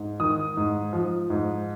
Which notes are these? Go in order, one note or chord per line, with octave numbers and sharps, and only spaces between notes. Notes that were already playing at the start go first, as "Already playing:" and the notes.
Already playing: G#2
D#3 D#6
G#2
F3
G#2